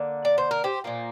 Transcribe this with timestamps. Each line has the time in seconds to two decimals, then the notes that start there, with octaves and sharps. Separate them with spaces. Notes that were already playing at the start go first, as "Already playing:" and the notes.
Already playing: D3 A#3
0.25 D5
0.38 C5
0.51 A#4
0.64 G4 C5
0.84 A#2 F3 A#3